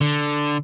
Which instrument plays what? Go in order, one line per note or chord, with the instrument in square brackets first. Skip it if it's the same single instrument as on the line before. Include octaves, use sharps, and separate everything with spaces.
[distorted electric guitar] D3